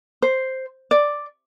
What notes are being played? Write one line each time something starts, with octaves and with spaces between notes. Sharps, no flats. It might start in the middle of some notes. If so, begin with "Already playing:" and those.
C5
D5